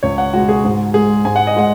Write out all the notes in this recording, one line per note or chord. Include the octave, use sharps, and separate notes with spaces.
C#2 C#5
F#5
B2 G#3 F#4
G#4
G#2
G#3 G#4
G#2 G#5
F#5
D#5
G#3 F#5